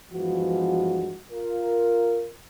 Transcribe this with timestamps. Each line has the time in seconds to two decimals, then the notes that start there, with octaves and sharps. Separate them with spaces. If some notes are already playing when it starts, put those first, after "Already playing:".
0.12 G2 E3 F3 G#3 B3 F#4
1.32 F4 A#4